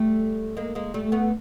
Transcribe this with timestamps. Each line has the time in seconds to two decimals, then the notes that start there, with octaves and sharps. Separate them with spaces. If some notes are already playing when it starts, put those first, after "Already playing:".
Already playing: G3 A3
0.57 G#3 A#3
0.75 G#3 A#3
0.94 G3 A3
1.12 A3 B3